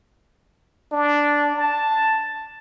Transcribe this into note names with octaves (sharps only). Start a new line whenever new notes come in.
D4
A5